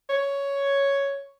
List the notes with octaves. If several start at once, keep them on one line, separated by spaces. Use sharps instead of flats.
C#5